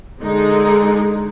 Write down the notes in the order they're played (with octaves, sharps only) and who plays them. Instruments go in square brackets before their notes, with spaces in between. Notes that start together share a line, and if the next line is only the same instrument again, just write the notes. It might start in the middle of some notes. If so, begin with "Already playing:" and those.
[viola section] D3 G#3 D#4